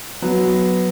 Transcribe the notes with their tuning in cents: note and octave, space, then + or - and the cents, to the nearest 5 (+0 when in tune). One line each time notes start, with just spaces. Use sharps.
F#3 +0 B3 +0